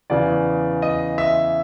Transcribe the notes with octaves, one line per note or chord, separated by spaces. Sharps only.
E2 C#3 E3 D5
D#5
E5